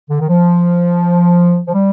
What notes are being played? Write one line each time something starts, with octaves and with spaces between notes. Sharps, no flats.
D3
D#3
F3
F3
G3